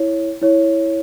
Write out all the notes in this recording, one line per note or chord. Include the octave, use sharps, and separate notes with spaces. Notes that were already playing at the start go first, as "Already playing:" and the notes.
Already playing: E4 C#5
E4 C#5